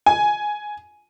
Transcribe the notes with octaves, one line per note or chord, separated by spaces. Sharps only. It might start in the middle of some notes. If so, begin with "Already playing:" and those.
G#5